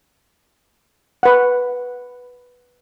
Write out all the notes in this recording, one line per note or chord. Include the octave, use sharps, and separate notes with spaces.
B4 F#5